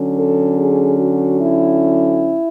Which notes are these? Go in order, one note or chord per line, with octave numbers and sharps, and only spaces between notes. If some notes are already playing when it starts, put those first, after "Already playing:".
Already playing: D3 F#3 C#4
A4
G#4
F#4
E4